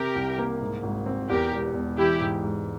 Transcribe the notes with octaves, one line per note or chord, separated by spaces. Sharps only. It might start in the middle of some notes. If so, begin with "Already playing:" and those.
Already playing: C3 G4 A#4
C2
A#3
G#2
G#1
C4
E2 G4 A#4
E1
E1
E3 E4 G4
G#2
G#2